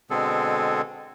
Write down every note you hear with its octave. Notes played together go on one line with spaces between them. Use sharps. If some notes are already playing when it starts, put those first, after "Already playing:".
B2 D3 G#3 C4 G#4 A4